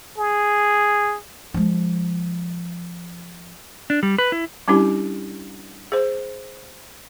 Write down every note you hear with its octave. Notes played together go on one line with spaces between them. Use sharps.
G#4
F3 G#3
D4
G3
B4
E4
G3 C#4 D4 E4 G4
G#4 C5